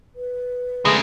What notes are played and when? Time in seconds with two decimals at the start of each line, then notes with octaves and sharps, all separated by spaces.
0.16 B4
0.85 C#3 G#3 A3